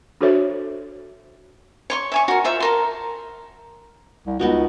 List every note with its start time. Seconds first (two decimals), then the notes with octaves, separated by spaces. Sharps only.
0.21 D4 F#4 A4 C5 C#5 E5
1.90 C#5 C6 C#6
2.12 E5 G#5 C#6
2.28 F#4 A#4
2.44 F4 C5 E5 C#6
2.60 A4 A#4 C6
4.27 C2
4.39 C#2 B3 D#4 F#4